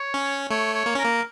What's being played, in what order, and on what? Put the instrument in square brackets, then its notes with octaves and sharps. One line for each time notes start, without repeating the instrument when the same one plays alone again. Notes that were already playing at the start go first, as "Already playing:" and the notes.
Already playing: [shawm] C#5
[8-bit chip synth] C#4
[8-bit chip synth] A3 [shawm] C#5
[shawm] C#5
[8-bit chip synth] A#3
C#4
[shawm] A#4
[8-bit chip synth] A#3